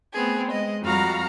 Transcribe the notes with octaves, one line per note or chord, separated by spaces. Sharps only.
A3 B3 C4 G#4
G#3 D#5
F2 G3 F#4 F5 A#5 F6